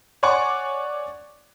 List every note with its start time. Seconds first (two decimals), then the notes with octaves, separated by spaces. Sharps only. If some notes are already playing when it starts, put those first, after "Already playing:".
0.23 C#5 D5 F#5 G#5 C#6 D6